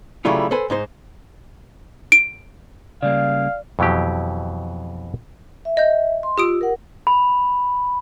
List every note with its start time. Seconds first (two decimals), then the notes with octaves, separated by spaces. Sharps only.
0.25 C#3 F#3 G3 A3 E4 F4
0.51 A4 B4 C5 G#5
0.70 G#2 D#4 C5
2.12 D7
3.02 C#3 G3 A#3 D5 F5
3.79 F2 B2 E3 F#3 G4
5.65 E5
5.77 D#5 G6
6.23 C6
6.38 F4 G4 D#6 E6 D7
6.61 A#4 F#5
7.07 B5